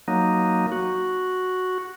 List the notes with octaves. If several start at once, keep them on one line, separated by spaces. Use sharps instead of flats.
F#3 A#3 D#4
F#4